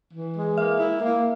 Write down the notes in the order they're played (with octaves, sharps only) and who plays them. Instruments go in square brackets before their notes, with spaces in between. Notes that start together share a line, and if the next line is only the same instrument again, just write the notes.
[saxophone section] E3
G#3
[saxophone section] A#3 [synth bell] E5
[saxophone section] E4
A#3